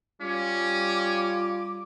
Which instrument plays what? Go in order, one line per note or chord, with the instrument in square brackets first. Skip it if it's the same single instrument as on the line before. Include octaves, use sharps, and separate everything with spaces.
[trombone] G3 [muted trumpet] C#4 [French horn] F4 [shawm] D6